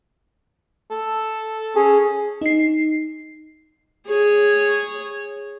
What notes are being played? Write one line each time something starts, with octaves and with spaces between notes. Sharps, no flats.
A4
C#4 G#4
D#4 C7
G#4 C#5